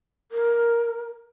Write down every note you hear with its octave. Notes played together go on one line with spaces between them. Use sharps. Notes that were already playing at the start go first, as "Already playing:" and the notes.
A#4